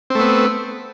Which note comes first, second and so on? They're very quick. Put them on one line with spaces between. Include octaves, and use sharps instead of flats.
C4 A3 B3